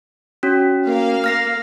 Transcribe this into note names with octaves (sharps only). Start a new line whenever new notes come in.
C#4 F#4
A#3 F5
F6 A#6 C7